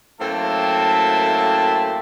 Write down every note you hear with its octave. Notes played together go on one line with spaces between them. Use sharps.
F#2 A2 A#3 C4 E5 A5